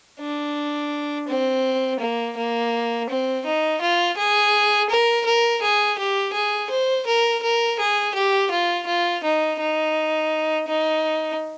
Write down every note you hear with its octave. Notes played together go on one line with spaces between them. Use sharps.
D4
C4
A#3
A#3
C4
D#4
F4
G#4
A#4
A#4
G#4
G4
G#4
C5
A#4
A#4
G#4
G4
F4
F4
D#4
D#4
D#4